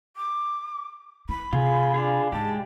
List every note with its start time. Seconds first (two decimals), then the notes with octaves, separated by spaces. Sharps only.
0.16 D6
1.29 E4 B5
1.53 C3 F4 G#4
1.94 D4 F4 G#4
2.32 G#2 G#3 G4 A5